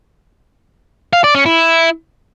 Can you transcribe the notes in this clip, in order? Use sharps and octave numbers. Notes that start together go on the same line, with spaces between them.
F5
D5
C#4
E4